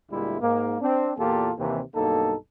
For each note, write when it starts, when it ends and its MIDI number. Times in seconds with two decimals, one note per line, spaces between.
0.11 0.38 38
0.11 0.38 46
0.11 0.38 55
0.11 0.38 56
0.11 0.38 64
0.41 0.76 44
0.41 0.76 58
0.81 1.12 60
0.81 1.12 62
1.18 1.51 40
1.18 1.51 46
1.18 1.51 58
1.18 1.51 65
1.18 1.51 67
1.18 1.51 69
1.58 1.80 39
1.58 1.80 48
1.58 1.80 52
1.95 2.34 35
1.95 2.34 43
1.95 2.34 58
1.95 2.34 63
1.95 2.34 69